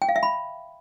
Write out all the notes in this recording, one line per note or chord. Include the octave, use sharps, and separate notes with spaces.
G5
F5
E5
B5